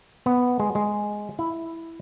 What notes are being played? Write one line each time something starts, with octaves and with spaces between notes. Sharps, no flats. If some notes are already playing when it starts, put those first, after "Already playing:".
B3
G#3
G#3
E4